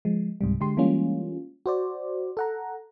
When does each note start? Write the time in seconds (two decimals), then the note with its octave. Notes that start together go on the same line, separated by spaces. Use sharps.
0.05 F3 G#3
0.41 C#2 G#2 C3 G3
0.61 D3 G#3 G4 C6
0.77 E3 G3 G#3 A#3 C#4 F4
1.66 F#4 C5 D5
2.37 A4 F#5 A#5